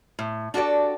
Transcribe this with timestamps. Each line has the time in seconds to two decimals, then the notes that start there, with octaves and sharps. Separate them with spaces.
0.19 A2
0.54 D4 F#4 G4 A4 D5